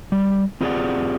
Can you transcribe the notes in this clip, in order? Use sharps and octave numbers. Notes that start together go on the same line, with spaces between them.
G3
C4 F4 G4 G#4 D5 F#5